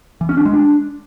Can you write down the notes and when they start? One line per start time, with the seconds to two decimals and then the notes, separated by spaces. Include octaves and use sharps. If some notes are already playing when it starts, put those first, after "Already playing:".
0.21 E3
0.29 C#4
0.37 D4
0.45 G#3
0.54 D4